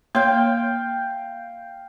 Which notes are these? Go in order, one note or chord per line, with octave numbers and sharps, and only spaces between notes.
A#3 C#5 F5 G5 C6